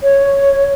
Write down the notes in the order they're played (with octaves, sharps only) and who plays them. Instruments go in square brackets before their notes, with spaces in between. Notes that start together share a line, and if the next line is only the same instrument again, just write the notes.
[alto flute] C#5